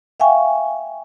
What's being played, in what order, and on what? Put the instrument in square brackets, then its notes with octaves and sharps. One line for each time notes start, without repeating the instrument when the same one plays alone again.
[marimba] E5 F5 G5 G#5 C#6